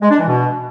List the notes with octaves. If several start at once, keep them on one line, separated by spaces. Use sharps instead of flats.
G#3
D4
E3
B2